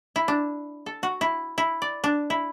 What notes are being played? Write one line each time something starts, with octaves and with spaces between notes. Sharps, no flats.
E4
D4
A4
F#4
E4
E4
D5
D4
E4